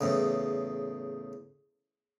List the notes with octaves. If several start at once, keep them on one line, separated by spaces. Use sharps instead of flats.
E2 A2 C#3